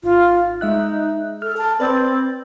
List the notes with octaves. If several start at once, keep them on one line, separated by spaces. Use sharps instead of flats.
G#1 F4
G#3 D#4 E5 F#6
A4 F6
A5
C4 B4 D5 A6